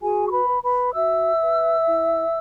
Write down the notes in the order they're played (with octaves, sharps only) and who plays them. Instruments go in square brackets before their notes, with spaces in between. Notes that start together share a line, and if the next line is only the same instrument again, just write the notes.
[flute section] F#4 G#4 G#5
C#6
B4 B5
B4
B4 B5
F#4 E5 E6
B4
E4